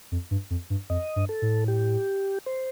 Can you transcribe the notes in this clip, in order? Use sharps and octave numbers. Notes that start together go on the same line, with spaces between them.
F2
G2
F2
G2
F2 D#5
G2
A4
A2
G4
C5